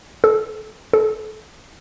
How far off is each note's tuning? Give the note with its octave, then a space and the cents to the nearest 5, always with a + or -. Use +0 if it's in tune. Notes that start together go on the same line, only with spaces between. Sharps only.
A4 -30
A4 -30